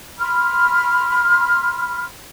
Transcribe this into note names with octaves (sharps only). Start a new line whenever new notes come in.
B5 C6 F6